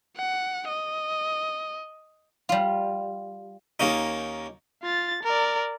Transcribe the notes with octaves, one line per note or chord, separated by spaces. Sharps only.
F#5
D#5
G3 F4
D#2 A#3 C#4 D#4
F4 A6
A#4 D5